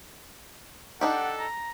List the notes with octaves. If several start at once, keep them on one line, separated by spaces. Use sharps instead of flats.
D4 D#4 G4 A4 F#5
A#5